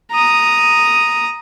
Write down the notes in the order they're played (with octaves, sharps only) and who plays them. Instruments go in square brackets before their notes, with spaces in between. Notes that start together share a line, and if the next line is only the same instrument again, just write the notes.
[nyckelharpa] A#5 D#6